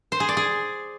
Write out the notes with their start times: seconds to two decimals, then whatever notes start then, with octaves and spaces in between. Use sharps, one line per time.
0.12 C5
0.20 G#4
0.29 D5
0.37 G#4